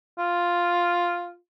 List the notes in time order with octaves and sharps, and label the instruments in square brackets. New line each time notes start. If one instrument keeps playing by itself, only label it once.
[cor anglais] F4